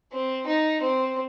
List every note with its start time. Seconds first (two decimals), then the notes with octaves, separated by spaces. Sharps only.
0.12 C4
0.47 D#4
0.81 C4